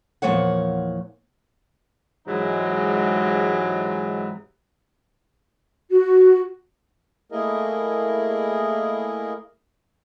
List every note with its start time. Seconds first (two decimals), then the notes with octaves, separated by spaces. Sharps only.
0.22 E2 A#2 F3 A#3 C#5 F#5
2.27 G#2 C3 E3 F#3 G#3 D#4
5.90 F#4
7.32 A3 A#3 E4 G#4 A#4 D#5